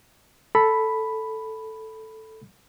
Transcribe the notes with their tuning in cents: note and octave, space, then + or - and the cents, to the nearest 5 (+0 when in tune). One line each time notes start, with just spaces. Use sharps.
A4 +0 B5 +0